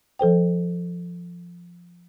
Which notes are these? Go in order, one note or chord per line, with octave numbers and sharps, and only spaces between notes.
F3 A4 C5 G5